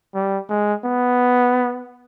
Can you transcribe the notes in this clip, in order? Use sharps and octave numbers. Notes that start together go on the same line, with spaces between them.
G3
G#3
B3